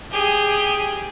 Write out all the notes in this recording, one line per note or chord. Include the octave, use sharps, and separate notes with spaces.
G4 G#4